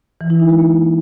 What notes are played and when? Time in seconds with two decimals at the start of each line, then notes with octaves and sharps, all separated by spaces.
0.21 E3
0.30 E4
0.40 D#4
0.49 G#3
0.59 A#3